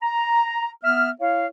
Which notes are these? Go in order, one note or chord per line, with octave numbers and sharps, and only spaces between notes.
A#5
B3 E5 F6
E4 C#5 F5